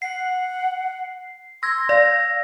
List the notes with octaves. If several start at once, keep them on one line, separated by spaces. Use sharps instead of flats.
F#5 C7
C6 E6 G#6 A#6
D5 F5 A#6